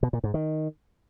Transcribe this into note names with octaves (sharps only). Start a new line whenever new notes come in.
B2
A#2
G#2
D#3